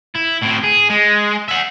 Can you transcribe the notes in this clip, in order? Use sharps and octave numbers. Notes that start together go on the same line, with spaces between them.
E4
A2 C4
G#4
G#3
E5 F#5